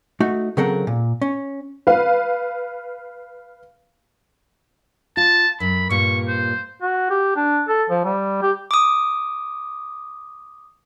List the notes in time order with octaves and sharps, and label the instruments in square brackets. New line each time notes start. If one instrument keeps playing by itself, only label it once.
[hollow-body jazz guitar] A3 D#4 F#4
C#3 F#3 C4 A4 A#4 F#5
A#2
C#4
[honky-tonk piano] B4 F5
[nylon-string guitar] F4 [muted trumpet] A5
[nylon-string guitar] F#2 [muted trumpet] B5
[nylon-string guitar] G2 A#2 [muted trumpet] C#6
[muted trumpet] C5
[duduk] F#4
G4
D4
A4
F3
G3
G4
[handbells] D6 D#6